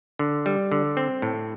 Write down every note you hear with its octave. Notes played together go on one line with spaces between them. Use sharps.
D3
G3
D3
C4
A2